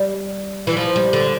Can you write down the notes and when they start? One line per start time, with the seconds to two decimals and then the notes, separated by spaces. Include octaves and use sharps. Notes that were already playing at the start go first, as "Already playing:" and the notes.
Already playing: G3
0.67 E3
0.77 F3
0.96 G3
1.13 D3